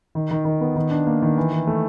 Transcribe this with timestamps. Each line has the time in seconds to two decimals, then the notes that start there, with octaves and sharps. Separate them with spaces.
0.15 D#3
0.31 D#3
0.45 D#3
0.61 B3
0.76 D#3
0.91 D4
1.07 A#3
1.22 D#3
1.37 E3
1.53 E3
1.67 A3